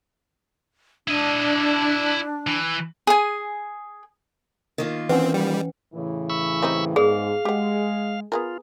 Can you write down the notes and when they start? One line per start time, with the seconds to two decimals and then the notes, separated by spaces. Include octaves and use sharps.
1.08 D4 E4 D#5
2.47 E3
3.07 G#4 G#5
4.78 D#3 A#3 F4
5.09 E3 C4 C#4 B4 F#5 G#5
5.34 G3 G5
5.93 A2 C#3 E3
6.30 B5 C#6 E6
6.62 G3 C4 D#4
6.96 G#2 D#3 B3 G#4 D5 F5
7.45 G#3 G4 F#5
8.32 B3 F4 G#4 A#4